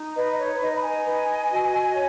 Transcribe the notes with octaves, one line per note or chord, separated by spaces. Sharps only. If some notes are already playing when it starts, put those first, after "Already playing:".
Already playing: D#4
B4 D#5
C#5
D#4 D#5
B5
D#5 G#5
B4
F#4
C#5